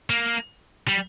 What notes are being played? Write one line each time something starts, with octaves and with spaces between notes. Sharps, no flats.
A#3
G3